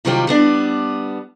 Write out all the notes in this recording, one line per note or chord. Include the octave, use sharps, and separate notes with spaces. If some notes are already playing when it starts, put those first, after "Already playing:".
C3 D#3 F#3 G3 F4 G4
G3 B3 D4